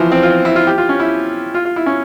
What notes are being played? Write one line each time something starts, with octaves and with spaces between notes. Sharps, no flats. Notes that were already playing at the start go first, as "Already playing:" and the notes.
Already playing: E3 F3
C4
F4
E4
F4
G4
F4
C#4
E4
F4
F4
E4
C#4